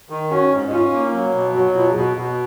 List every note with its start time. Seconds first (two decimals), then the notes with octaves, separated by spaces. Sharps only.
0.10 D#3
0.31 C#4 F#4
0.51 G#2
0.67 D#4
0.71 C#4 F4
0.93 A#3
1.13 F#3
1.34 B2
1.54 F#3 F#4
1.75 B2 F4
1.90 G#4
1.95 B2 F#4
2.16 B2 F#4